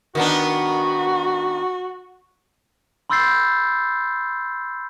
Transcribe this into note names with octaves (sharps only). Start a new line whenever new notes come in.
D#3 B3 D4 F#4
B5 C6 E6 G6 A6 C7